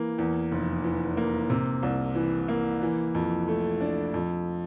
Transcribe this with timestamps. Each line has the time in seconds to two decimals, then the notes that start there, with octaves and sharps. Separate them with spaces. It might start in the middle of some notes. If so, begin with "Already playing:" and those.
Already playing: E3 A#3
0.18 E2
0.51 F1
0.84 E3
1.17 A#3
1.50 C3
1.83 C2
2.15 E3
2.48 A#3
2.82 E3
3.15 F2
3.48 A3
3.81 D4
4.14 F2